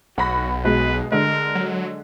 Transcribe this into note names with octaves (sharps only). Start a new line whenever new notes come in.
B1 F#4 F#5 B5 A#6
B2 G#3 B4
D3 G#3 A#4
F#3